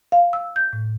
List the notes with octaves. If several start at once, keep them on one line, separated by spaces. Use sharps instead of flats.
F5
E6
G6
A2